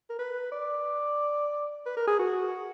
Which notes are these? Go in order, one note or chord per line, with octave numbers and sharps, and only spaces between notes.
A#4
B4
D5
B4
A#4
G#4
F#4